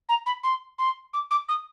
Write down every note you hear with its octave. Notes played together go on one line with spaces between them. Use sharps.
A#5
B5
C6
C6
D6
D6
D#6